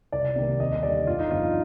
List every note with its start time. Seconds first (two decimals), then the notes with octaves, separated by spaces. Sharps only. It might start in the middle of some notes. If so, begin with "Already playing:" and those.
0.12 C2 D5
0.36 C3 D#3 G3 A#3
0.59 D#2 D#5
0.83 D3 G3 D5
1.07 G1 F4
1.19 D#4
1.30 G2 F3 C4 F4